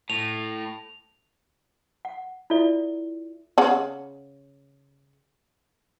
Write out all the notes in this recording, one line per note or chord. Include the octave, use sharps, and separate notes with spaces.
A2 F7
F#5
E4 F4 A4 D5 E5
C#3 F#5